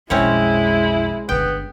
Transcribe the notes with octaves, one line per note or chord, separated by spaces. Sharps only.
B1 F2 G#3 C4 C#4 E4 C#5
G1 D3 B3 G5